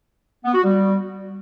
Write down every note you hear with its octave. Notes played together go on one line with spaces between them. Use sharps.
B3
F#4
G3